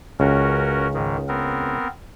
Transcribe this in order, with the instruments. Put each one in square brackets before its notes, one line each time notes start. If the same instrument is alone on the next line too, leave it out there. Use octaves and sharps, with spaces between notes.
[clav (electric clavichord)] C#2 [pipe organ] C#4 F#4 A#4
[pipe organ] G#2 D#3
B3 C4 A#4